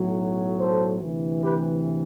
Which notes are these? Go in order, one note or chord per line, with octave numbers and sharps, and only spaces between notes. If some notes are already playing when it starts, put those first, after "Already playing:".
Already playing: B1 A2 F#3
A4 C5
D2 C3 E3
G4 B4